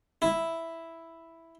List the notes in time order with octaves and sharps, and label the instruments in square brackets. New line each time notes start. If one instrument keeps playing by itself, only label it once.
[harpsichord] E4